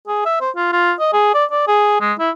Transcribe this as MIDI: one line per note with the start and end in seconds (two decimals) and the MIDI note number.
0.07 0.22 68
0.25 0.38 76
0.41 0.50 72
0.56 0.68 65
0.72 0.92 65
0.99 1.12 75
1.13 1.31 68
1.34 1.44 74
1.51 1.63 74
1.67 1.98 68
2.01 2.13 56
2.19 2.31 64